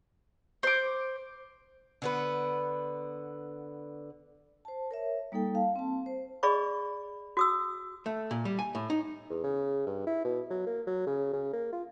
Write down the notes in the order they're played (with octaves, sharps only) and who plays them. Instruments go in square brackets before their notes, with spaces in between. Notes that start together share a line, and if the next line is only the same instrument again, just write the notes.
[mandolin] C5 D6
[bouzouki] D3 B3 B4
[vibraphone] C5 A5
A#4 C#5 E5
G3 A#3 D#4 A4 G5
F5 A5
C4 A5
C5
[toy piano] G#4 D5 D#5 B5 C#6
F#4 D#6 E6
[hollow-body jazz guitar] A3
A#2
G3
G#5
A2
D#4
[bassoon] E2
C#3
G2
E4
B2
F#3
A#3
F#3
C#3
C#3
A#3
F4